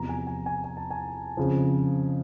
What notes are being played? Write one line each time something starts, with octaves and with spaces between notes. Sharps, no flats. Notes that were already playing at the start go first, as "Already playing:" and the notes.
Already playing: E2 C3 F3 A#5
G#5
G#5
G#5
G#5
A5
G#5
F2 C#3 F3